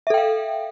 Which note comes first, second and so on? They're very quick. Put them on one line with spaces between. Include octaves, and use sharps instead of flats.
E5 A4 G5 F5